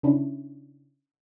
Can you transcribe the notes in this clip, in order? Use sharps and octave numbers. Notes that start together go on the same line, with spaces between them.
C#3 C#4 D4 E4